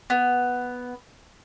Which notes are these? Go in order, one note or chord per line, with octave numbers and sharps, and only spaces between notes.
B3